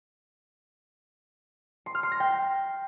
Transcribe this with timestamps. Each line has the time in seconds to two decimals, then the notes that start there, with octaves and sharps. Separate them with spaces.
1.86 C6
1.95 F6
2.03 C6
2.12 A#6
2.20 G5